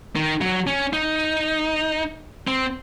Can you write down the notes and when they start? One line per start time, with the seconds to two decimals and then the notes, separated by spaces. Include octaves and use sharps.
0.16 D#3
0.41 F#3
0.67 C#4
0.93 D#4
2.48 C4